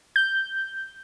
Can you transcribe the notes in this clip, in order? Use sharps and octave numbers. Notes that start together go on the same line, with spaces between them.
G6